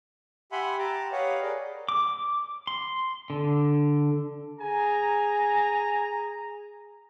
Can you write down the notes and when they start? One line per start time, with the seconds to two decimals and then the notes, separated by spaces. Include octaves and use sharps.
0.52 G4 E5 F#5 G#5 B5 C6
0.79 G4 A5 A#5 D6
1.12 G4 B4 C#5 D#5 F5 F#5
1.42 G#4 A#4 D5 D#5
1.89 D6
2.67 C6
3.30 D3
4.61 G#4 G#5 A#5